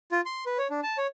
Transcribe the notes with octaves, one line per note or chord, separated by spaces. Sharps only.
F4
C6
B4
C#5
D4
A5
C#5